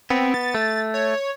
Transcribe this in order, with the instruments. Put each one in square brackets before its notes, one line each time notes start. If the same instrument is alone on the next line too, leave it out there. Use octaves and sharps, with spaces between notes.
[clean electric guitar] B3 [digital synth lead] C4
[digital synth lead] A6
[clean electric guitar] A3
[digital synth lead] C#5